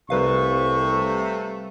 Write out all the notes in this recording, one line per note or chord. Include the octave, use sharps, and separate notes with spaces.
C2 C3 G3 A3 B4 F5 C#6